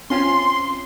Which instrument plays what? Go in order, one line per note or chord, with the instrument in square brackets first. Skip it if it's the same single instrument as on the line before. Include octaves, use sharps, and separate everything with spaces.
[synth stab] C4 C#4 F4 [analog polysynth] C6